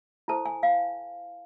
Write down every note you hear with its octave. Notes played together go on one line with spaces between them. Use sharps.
E4 A4 C5 A5
G#5
F5